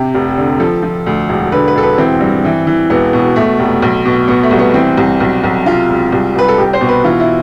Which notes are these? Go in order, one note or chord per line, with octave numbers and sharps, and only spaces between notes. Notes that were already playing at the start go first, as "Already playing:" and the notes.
Already playing: C3 G4
F1
D3
F3 A4
F3
D2
E1
D3 B4
B4
E1 A4
B4
E3 C4
G2
E3
E3
E1 B3
B2
B2 A3
F1
B1
B2
B2 B3
A3
C2
B3
E3 C4
C2
B1
B1
C3 F4
E1
C2
C2 B4
A4
C2 G4
C5
B2
B4
E3 F4
E4